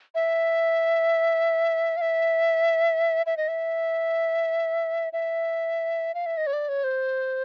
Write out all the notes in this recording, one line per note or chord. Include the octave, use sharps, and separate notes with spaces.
E5
F5
E5
E5
D#5
E5
E5
F5
E5
D#5
C#5
D5
C#5
C5